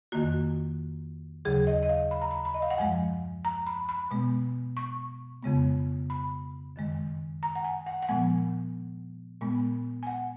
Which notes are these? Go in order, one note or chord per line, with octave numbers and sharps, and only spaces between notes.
F2 D#3 A#3 F#4
D#2 C#3 F#3 G#4
D#5
D#5
F5
B5
A#5
B5
B5
D#5
F5
F#5
F#2 F3 G#3 G#5
A#5
B5
B5
B2 G#3 B3
C#6
F2 C#3 G#3 B3
B5
F#2 D#3 G#3
A#5
F#5
G#5
F#5
F#5
A#2 F3 G#3 B3 G#5
A#2 G#3 B3
G#5
F#5